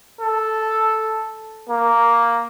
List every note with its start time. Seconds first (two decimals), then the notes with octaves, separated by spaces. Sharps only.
0.21 A4
1.69 A#3